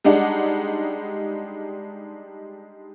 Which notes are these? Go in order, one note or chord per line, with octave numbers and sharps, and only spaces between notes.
G3 G#3 D4 D#4 F#5